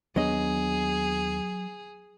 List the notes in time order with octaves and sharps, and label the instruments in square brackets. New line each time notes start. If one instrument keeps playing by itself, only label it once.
[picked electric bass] D#2 B3 D4 [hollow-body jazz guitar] F#3 D#5 [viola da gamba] G#4